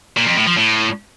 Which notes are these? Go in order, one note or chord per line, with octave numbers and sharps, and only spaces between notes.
A#2
F2
A2
F3
A2